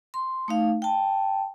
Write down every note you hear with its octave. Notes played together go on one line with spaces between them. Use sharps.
C6
A3 D#4 F5
G5 A5